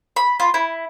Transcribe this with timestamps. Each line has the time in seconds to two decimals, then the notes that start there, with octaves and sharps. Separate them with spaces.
0.16 B5
0.40 F4
0.54 E4